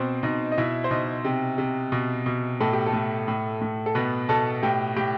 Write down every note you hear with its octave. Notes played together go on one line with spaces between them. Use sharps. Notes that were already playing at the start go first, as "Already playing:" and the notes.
Already playing: B2 C4 C5
B2 D#4 D#5
D#5
B2 E4 E5
C5
B2 D#4 D#5
C3
C3
B2
B2
A2 A4
G4
A3 A4
A2
A2
A2
A4
B2 B3 B4
B2 A4 A5
A2 G4 G5
A2 G4 G5